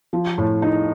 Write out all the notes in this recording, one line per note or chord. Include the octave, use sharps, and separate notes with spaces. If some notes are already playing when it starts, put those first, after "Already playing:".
F3
A2
D#4